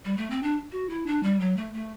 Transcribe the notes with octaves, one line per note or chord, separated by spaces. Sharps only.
G3
A3
C4
D4
F#4
E4
D4
G3
F#3
A3
A3